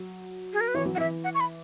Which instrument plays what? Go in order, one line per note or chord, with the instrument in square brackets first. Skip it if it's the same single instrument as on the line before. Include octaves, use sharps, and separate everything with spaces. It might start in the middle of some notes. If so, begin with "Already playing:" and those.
Already playing: [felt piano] F#3
[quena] G#4
A#4
B4
[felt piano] E3 [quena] C#5
[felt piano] F#3
[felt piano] E3 [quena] E5 F#5
[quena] F#5
C#6
B5